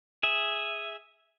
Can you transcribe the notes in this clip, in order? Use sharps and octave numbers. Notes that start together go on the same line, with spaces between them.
G#4 E5